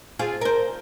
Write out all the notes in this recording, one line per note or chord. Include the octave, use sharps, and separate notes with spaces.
C4 F4 G#4
A#4 C5